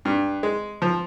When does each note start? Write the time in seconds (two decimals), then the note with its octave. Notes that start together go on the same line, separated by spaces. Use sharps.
0.05 G2
0.43 G#3
0.82 F3